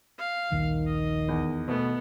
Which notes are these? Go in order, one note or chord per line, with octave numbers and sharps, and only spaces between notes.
F5
D#1 A#1 D#2 D#3
D#5
E2
B2 A3 B3